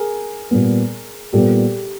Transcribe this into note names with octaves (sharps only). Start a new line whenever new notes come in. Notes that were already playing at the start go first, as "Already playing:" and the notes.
Already playing: G#4 A#4
A#2 G3 B3
A#2 G3 B3 G4 A4